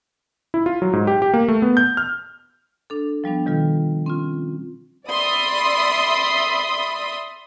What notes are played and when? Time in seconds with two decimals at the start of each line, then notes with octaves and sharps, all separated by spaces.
0.54 E4
0.66 F4
0.82 F#3
0.93 G#2
1.07 G4
1.22 G4
1.34 A#3
1.48 A3
1.62 B3
1.77 G6
1.97 F6
2.90 D4 A4
3.24 F3 G3 B3 D4
3.45 B2 D#3 G3 F4 A4
4.06 C4 C#4 F4
5.09 D5 E5 B5 C6 D#6